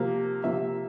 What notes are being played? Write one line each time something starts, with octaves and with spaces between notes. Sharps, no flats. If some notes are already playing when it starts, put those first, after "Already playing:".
Already playing: C3 F3 A#3
C3 F3 A#3 E5